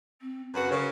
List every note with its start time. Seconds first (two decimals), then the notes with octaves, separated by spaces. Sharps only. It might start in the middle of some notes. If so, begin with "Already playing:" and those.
0.21 C4
0.54 F#2 C#3 F#4 B4
0.71 C#3 A#4